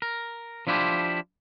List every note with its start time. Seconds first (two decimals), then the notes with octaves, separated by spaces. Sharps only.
0.02 A#4
0.67 F3 D4 E4 F4 G4